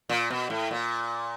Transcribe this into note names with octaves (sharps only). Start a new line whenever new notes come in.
A#2
B2
A2
A#2